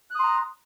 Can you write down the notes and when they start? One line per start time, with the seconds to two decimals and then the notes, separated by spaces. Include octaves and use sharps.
0.11 F#6
0.15 D#6
0.19 C6
0.24 A#5